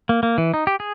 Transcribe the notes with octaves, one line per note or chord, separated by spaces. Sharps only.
A#3
A#3
E3
D#4
G4
G#4